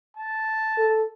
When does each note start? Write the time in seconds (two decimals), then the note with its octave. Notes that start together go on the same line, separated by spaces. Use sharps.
0.17 A5
0.77 A4